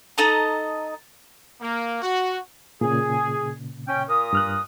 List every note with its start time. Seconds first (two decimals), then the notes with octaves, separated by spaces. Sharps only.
0.18 D#4 A4 D#5 A#5
1.61 A#3
2.02 F#4
2.81 A#2 C#3 G#4
3.87 C#4 G5
4.09 A#2 A#4 D#6
4.33 G2 F6 F#6